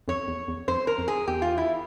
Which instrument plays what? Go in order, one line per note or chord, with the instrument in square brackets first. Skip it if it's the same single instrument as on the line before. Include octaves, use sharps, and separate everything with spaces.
[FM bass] F2 [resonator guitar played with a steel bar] C#5
[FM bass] E2
E2
[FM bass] F2 [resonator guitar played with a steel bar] C5
[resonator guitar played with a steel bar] A#4
[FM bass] F2
[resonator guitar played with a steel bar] G#4
[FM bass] E2 [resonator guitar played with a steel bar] G4
[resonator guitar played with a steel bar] F4
E4